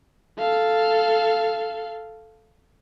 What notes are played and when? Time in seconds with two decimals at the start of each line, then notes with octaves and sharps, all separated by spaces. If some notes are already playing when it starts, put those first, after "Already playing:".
0.39 A4 F5